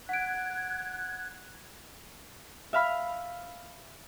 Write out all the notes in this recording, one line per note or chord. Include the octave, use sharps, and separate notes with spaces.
F#5 F#6 G#6 D7
E5 F5 B5 F6